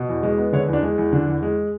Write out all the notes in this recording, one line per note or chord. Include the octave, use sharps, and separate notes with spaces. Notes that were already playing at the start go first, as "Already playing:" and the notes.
Already playing: B2
E2
G#3
B3
D3 C#5
E2
D4
G#3
E2
D3 D4
E2
G#3